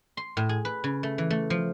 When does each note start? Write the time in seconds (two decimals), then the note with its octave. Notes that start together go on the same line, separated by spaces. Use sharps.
0.17 C6
0.37 A2
0.49 G#4
0.65 B4
0.84 C#3
1.03 A3
1.18 E3
1.30 A3
1.50 F3